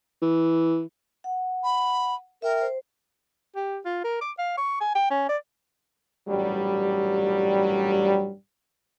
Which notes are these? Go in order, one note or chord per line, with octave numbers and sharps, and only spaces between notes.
E3
F#5
B5
A#4 E5 G5
C5
G4
F4
A#4
D6
F5
C#6
G#5
G5
C#4
D5
A1 G2 A#2 F#3 G3